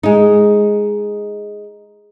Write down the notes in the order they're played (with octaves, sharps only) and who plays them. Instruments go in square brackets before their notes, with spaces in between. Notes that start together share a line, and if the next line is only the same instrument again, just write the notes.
[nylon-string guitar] G#3 D#4